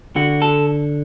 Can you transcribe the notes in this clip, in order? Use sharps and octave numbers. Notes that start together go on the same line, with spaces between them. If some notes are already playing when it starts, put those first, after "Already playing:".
D3 F#4
A4